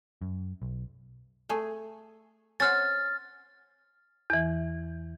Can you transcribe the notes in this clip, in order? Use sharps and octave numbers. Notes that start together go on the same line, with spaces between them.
F#2
B1
A3 G#4
C#4 C5 F#5 F6 A6
E2 E3